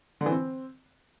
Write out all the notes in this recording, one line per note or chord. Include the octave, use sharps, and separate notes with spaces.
D3
E3
C4